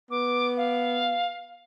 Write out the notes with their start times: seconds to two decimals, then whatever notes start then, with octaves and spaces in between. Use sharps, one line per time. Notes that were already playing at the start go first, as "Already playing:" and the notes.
0.11 B3 D6
0.57 F5